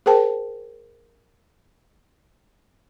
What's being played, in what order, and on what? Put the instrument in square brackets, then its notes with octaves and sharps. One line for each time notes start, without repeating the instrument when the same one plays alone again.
[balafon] G#4 A#4 C5 G5 A5